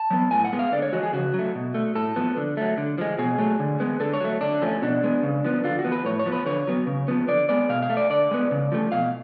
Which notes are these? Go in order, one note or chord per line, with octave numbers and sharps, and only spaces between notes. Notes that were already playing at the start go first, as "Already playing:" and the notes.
Already playing: A5
F#3 B3
A2 G#5
F#5
G#3 B3
F5
D3 D5
C#5
F3 G#3 F#4
G#4
C#3 F#4
F#3
A3
B2
A3
A2 A4
F3 B3
D3
F#3 A3
D3
F3 G#3
B2 G#4
F#3 A3
D3
G#3 B3
D3 A4
C#5
F#3 A3
D3 D4
F3 A3 C#4
B2 D4
G#3 B3
C#3
F3 B3
D3 F4
F#4
F3 B3
B4
A2 C#5
C#5
F3 B3
B4
D3 C#5
F#3 B3
C#3
F3 B3
D3 D5
G#3 B3 D5
B2 F5
F5
A3
D5
D3 D5
G#3 B3
C#3
F3 A3
B2 F5